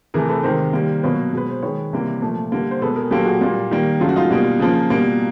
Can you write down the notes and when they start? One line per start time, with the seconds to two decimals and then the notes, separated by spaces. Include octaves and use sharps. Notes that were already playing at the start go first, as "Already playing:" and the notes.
0.14 C3 E3 A3 G#4 A#4
0.29 A4 B4
0.43 C3 D#3 G#3 A#4 C5
0.73 D#3 G3 A#3
1.03 B2 F#3 A#3 B4 C#5
1.33 B2 G#3 B4
1.50 C5
1.63 D#3 G#3 B4 C#5
1.93 C3 E3 G3 A#3
2.22 A#2 F3 A3
2.52 D3 G3 A#3
2.71 C5
2.81 B2 G#3 A4 B4
2.96 G#4 A#4
3.11 A#2 F#3 A#3 G4 A4
3.26 F#4 G#4
3.41 A#2 G3 A#3
3.71 D#3 G3 A#3
4.00 C#3 F#3 A3 F4
4.09 F#4
4.16 D#4 F4
4.31 B2 G3 A#3
4.59 C#3 F3 A#3
4.90 B2 G3 A#3